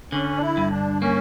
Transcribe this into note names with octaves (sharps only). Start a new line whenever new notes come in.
D3 C#4
D4
E4
G2
D4
A#3 C#4